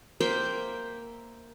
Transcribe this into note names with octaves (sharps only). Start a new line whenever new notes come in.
A#3 C5 E5 G5